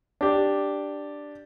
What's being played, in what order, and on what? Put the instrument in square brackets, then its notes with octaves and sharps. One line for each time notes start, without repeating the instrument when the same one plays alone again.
[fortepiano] D4 G4